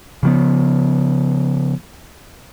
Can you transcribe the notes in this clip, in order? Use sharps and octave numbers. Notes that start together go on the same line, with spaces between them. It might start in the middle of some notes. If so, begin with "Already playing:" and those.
C#3 F3 B3